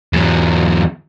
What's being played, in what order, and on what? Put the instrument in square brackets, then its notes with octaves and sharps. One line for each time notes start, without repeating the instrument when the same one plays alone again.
[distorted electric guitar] E2 F#3